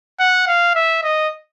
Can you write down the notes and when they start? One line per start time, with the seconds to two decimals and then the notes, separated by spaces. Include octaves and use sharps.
0.19 F#5
0.47 F5
0.75 E5
1.03 D#5